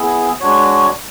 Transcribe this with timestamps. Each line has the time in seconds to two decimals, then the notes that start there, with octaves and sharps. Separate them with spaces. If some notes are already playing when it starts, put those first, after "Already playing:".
Already playing: B3 E4 G#4
0.40 G#3 D4 F#4 C#5